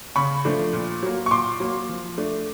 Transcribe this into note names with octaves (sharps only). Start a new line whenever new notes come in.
C#3 B5 C#6
F3 A3 D4
A#2
F#3 A#3
C#6
A#2 C6 D6
F#3 A#3
F3
A3 D4